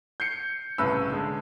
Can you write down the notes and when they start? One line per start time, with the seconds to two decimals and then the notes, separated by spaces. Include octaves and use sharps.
0.20 G6 C7 C#7
0.78 C2 A2 C#3 B4 E6
1.12 D3 G#3